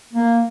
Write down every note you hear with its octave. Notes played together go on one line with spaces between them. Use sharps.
A#3